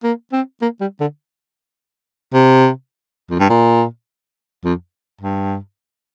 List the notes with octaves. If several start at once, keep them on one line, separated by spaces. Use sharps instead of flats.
A#3
C4
A#3
G3
D3
C3
F2
G2
A#2
F2
G2